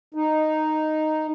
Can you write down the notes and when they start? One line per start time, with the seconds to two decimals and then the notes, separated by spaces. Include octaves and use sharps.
0.14 D#4